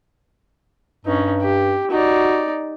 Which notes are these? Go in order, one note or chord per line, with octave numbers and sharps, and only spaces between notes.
G2 C#4 D#4
G4
D#4 F#4 D5